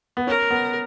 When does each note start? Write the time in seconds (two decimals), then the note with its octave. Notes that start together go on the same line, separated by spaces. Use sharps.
0.17 B3
0.27 C#4 A#4
0.50 B3